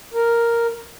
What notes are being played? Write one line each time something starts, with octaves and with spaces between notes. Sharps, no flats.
A#4